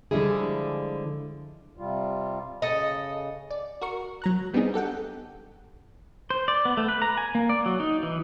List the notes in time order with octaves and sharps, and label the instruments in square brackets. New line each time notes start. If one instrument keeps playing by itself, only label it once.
[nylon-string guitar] D3 F3 G3 G#3 E4 G#4
[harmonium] C3 G3 F4
[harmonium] C#3 [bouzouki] A4 D#5
[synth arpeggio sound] D5
F#4 A#4 C#6
F#3 A#5 F#6
G3 B3 C4 D4 D#4 G#4
G4 A4 F#5 G5
[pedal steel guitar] C5
D5
B3
A3
B4
A#5
G#5
A#3
D5
F#3
D#4
E3